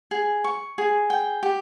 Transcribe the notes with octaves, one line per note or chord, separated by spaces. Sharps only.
G#4
C#6
G#4
G5
G4